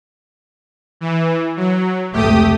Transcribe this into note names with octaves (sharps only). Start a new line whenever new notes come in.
E3
F#3
F1 C#2 A3 G4 D#6